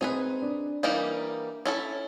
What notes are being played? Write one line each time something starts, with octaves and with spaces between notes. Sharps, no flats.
C4 D#4 G#4 B4
D4
E3 G3 A#3 D#4 G4
C#4 E4 A4